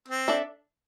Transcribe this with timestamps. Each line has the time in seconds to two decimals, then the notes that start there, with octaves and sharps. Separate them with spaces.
0.08 C4
0.28 D4 A4 E5